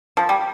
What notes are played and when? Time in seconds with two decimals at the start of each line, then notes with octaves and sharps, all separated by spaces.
0.17 F3
0.29 G3